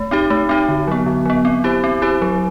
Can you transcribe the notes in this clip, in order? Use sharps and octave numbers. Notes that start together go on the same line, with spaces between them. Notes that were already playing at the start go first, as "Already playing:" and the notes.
Already playing: A3
C4 D#4 G4
A3
C4 D#4 G4
D3
F#3 B3
D3
F#3 B3
C4
E4 G4 C5
C4
E4 G4 C5
F#3